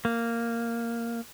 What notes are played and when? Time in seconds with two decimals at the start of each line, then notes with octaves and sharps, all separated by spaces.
0.05 A#3